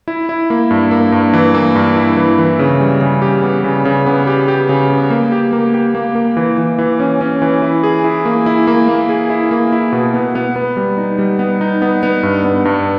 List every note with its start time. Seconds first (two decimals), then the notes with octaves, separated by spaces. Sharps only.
0.08 E4
0.29 E4
0.50 A#3
0.71 G2
0.91 A#3
1.12 G2
1.33 E3
1.54 A#3
1.75 G2
1.96 E4
2.17 E3
2.39 E3
2.59 C#3
2.80 G3
3.01 C#3
3.22 G4
3.43 B3
3.64 C#3
3.85 C#3
4.06 B3
4.27 G4
4.48 G4
4.69 C#3
4.90 B3
5.10 A#3
5.32 G4
5.53 A#3
5.74 G4
5.95 A#3
6.15 A#3
6.37 E3
6.58 E3
6.78 E3
7.00 C#4
7.21 C#4
7.42 E3
7.62 E4
7.83 G#4
8.04 E4
8.25 A#3
8.46 E4
8.67 A#3
8.89 A#3
9.09 G#4
9.30 E4
9.51 A#3
9.72 E4
9.92 B2
10.14 B3
10.35 B3
10.56 B3
10.77 G3
10.98 D#4
11.19 G3
11.39 B3
11.61 D#4
11.82 B3
12.03 B3
12.23 G2
12.44 B3
12.65 G2